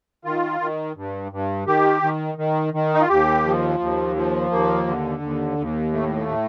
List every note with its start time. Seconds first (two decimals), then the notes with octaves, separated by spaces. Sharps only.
0.25 D#3 F4
0.60 D#3
0.96 G2
1.32 G2
1.67 D#3 G4
2.02 D#3
2.38 D#3
2.74 D#3
2.94 D#4
3.01 F4
3.09 D#2 G4
3.45 F3
3.80 D#2
4.16 F3
4.51 D#2 A#3
4.87 D3
5.22 D#2
5.58 D#2
5.93 A2 A3
6.15 A3
6.28 A2